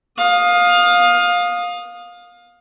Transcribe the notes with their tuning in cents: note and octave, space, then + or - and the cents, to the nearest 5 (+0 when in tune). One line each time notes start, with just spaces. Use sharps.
F5 +20 D#6 -5